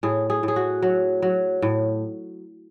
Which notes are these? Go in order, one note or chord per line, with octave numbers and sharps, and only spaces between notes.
A2 G#4
G#4
A2
G#4
F#4
F#3
F#3
A2